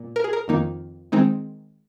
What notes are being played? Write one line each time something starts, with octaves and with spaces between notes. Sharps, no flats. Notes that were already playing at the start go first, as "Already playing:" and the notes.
Already playing: A#2
A#4
G#4
A#4
F2 D#3 A#3 D#4
D#3 G#3 C4 D#4